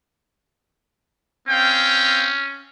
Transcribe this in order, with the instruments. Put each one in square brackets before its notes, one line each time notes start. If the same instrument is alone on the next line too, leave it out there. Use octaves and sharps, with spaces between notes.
[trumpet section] C4 F5 G5 [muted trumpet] C#4